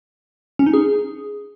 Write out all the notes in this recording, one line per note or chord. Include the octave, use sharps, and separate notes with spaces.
C#4
D#4
G#4